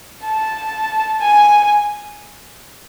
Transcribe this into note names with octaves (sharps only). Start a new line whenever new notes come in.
A5
G#5